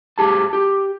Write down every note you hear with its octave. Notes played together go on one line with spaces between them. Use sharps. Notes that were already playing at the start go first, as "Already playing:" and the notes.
G#2 G4 G#4 A5
G4